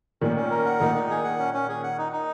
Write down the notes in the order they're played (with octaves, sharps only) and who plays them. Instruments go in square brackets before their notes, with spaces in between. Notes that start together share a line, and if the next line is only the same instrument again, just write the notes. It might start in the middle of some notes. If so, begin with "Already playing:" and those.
[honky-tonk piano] A#2 D#3 [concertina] C#4
[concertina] C#4
A#4
F#5
[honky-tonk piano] A#2 D#3 [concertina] D#4
[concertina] D#4
G#4
F#5
C#4
C#4
G#4
F#5
D#4
D#4